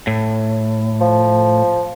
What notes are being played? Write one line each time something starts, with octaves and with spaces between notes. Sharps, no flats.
A2
F3